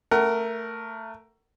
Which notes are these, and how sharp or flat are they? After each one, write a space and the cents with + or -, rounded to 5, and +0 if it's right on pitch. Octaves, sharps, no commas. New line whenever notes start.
A3 +20 A#4 +0 F#5 +35